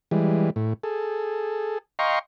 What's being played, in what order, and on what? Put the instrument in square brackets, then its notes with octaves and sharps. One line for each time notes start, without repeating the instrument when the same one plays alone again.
[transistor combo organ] E3 G3 G#3
A2
G#4 A4
D#5 F5 G5 A#5 C6 C#6